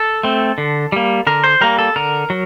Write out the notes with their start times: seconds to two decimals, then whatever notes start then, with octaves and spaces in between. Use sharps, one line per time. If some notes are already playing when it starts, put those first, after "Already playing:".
Already playing: A4
0.23 A3 C4
0.58 D3
0.92 G3 A#3
1.27 D3 A#4
1.44 C5
1.61 G3 A#3 A#4
1.79 A4
1.96 D3 A#4
2.30 F#3